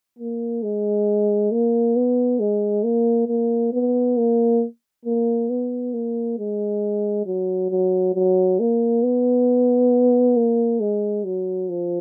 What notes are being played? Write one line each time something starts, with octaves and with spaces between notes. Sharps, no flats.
A#3
G#3
A#3
B3
G#3
A#3
A#3
B3
A#3
A#3
B3
A#3
G#3
F#3
F#3
F#3
A#3
B3
A#3
G#3
F#3
F3